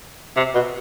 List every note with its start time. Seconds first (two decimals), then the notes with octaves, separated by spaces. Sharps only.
0.37 C3
0.54 B2